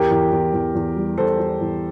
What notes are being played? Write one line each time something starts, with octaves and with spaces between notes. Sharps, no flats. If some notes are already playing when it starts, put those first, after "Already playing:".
Already playing: E2 G4 A#4
E2
E2
E2
E2
G3
G3 A4 C5
G3
E2